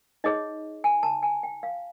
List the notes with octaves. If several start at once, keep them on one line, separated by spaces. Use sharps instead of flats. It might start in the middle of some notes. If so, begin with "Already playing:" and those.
D#4 G#4 C#5 D#5
G#5
A5
G#5
G5
F5